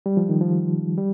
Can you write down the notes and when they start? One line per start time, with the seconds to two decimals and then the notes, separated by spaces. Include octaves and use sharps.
0.06 G3
0.17 F3
0.29 D#3
0.41 F3
0.98 G3